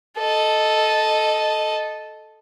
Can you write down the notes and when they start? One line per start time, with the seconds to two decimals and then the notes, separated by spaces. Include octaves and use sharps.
0.19 A4 D#5